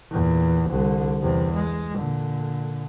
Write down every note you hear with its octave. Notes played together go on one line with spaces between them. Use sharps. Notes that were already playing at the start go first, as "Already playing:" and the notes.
E2 A#2
C2 D3
E2 C3
G#3
A#2 D3